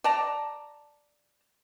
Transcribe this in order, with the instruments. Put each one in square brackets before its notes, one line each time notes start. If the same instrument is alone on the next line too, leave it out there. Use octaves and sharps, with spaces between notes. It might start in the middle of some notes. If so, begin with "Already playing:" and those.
[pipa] D5 A5 A#5